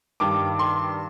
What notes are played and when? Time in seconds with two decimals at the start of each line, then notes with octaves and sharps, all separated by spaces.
0.20 G2 D#3 G3 D6
0.59 C6